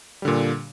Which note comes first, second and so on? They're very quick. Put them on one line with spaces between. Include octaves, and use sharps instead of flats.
G3 D3 A#2